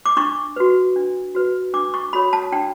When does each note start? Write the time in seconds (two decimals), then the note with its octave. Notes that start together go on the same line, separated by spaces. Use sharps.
0.06 D6
0.17 D4 C#6
0.56 F#4 B4
0.96 D4
1.35 F#4 B4
1.74 D4 D6
1.94 C#6
2.13 F#4 A4 C#5 B5
2.33 A5
2.52 D4 G5